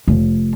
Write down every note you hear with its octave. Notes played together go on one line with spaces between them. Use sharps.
F1